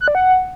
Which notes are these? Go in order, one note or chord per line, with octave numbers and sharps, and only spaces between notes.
F#6
D5
F#5